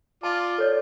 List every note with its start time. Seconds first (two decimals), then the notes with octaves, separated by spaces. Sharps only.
0.23 F4 D5 A5
0.58 A4 C#5 D5